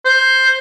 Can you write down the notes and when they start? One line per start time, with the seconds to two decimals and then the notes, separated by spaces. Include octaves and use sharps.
0.05 C5